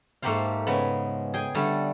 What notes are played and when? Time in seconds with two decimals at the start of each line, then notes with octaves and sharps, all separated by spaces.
0.22 G#2 A3 A#3 G4 C5 F5
0.67 C#3 G#3 B3
1.34 G#4 G5 G#5
1.55 D3 G3 A3